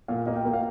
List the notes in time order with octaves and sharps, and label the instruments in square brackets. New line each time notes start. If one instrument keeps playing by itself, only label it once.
[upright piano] A#2 [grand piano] F5
[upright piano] A#3 [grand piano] D#5
[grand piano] G5
[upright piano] A#3
[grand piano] F5